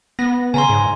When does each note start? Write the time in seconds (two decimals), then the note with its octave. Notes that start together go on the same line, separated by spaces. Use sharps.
0.19 B3 A#6
0.54 C#3 G#5 A#5 C6
0.70 G#2